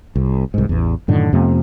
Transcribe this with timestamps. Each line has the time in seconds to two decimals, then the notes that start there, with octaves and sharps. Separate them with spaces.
0.16 C2
0.54 C2 G#2
0.69 A1 E2
1.08 F#2 A2 D3 D#3
1.33 F2 C3 A3 B3